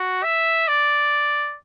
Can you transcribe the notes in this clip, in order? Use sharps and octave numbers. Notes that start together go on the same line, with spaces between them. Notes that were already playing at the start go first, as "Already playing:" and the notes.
Already playing: F#4
E5
D5